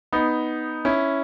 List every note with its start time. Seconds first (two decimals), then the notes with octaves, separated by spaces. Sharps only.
0.13 B3 D#4
0.85 C#4 E4